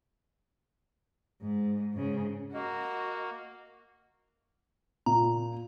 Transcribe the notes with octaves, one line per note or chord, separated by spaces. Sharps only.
G#2
G#2 C#3
A#3 F#4 D#5
A#2 A#5